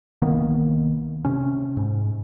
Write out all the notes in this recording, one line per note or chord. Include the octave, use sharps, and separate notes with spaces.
C2 D#3 A#3 B3
C3 C#4
G#2